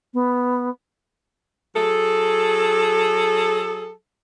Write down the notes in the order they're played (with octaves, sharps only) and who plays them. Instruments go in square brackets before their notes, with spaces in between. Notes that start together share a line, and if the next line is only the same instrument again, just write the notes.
[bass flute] B3
[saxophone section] F#3 G#4 A4